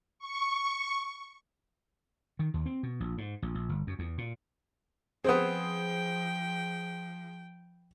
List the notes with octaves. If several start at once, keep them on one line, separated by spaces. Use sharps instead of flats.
C#6
D#3
D#2
C4
B2
A#1
G#2
A#1
A#1
G1
F#2
E2
A#2
F3 B3 C4 G#4 C5 G5 D#6